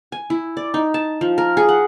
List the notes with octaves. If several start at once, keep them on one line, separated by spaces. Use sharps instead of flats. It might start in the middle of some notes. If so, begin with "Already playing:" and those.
G#5
E4
D5
D#4
A5
F3
A#4
G#4
F#5